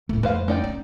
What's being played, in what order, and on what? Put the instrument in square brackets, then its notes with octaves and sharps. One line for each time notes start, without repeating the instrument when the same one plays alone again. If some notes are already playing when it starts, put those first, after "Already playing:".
[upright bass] D#1 [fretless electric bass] A2 A3
[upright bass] F2 [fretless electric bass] G#3 A3 [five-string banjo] B4 C5 F5
[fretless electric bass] A3 C#4 [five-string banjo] D#4 D5 G5
[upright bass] B3